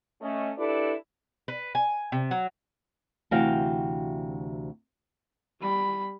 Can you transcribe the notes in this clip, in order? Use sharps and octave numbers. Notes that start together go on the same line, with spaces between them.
A3 C#4 D#5
D4 E4 G4 A4 B4 D5
B4
G#5
C3
F#3
D2 C3 E3 F#4 F5 G5
G3 B5